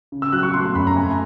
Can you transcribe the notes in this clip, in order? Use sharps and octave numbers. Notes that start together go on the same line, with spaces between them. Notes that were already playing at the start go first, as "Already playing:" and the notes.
C#3
E6
F#3 F#6
C#6
A3 C6
C6
F#2 B5
A#5
A3 G#5